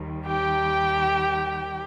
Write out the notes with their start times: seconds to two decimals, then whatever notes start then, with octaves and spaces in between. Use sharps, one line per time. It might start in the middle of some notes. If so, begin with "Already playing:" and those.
Already playing: D#2 D#3 G3
0.26 G4 G5